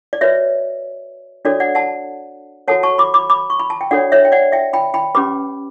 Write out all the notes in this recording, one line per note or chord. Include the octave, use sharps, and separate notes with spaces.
D5
F#4 B4 C#5 E5
D4 F#4 A4 C#5 D5
D5 F#5
F#5 A5
F#4 A4 C#5 F#5 A5
A5 C#6
B5 D6
B5 D6
B5 D6
C#6
B5
A5
G5
D4 F#4 A4 C#5 D5 F#5
C#5 E5
G5
D5 F#5
E5 G5
G5 B5
G5 B5
C#4 G4 B4 B5 D6